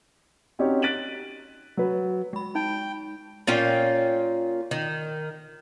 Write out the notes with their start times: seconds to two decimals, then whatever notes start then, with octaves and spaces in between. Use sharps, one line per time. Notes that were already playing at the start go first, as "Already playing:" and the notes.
0.59 C4 C#4 D#4 F#4 G4 C#5
0.82 F#6 A6 B6 D7 D#7 F#7
1.77 F#3 B4
2.33 G#3 B5
2.55 D#4 G5
3.47 A#2 C#4 F4 G5
4.71 D#3